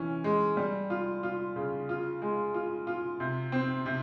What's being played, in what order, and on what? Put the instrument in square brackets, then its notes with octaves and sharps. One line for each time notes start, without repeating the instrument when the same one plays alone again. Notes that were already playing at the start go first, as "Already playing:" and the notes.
Already playing: [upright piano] E3 C#4
G#3
G3
F4
F4
C#3
F4
G#3
F4
F4
C3
C4
C3